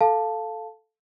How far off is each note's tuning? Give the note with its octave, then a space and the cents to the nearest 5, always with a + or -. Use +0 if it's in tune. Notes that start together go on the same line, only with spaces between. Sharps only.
A4 +0 F5 +0 A5 +0